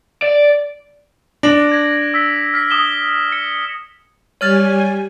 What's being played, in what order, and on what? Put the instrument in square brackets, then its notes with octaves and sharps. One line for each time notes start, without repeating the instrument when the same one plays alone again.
[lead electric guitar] D5
[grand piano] D4 [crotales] A#6 D7 F#7
[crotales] G#6 A#6
E6 B6
F6 B6
D#6 E7 G7
C#7
[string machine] G3 G#5 [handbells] C#5 F6 A6